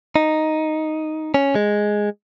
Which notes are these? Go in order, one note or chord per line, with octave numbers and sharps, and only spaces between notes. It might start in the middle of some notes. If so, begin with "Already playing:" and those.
D#4
C#4
G#3